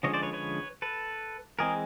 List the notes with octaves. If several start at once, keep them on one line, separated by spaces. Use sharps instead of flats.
D3 F3 G#3 C#4 C#5 D#5
C5 D5
B4 C#5
B4 C#5
A4 B4
E3 G#3 C4 G#4 A#4